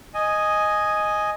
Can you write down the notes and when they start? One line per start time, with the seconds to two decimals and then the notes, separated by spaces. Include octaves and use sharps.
0.14 D#5 G#5